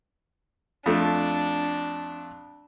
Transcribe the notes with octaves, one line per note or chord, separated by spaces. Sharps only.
F2 A3 D4